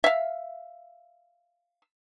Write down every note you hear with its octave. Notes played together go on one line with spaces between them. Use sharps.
E5 F5